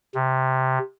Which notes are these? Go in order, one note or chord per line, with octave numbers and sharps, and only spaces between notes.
C3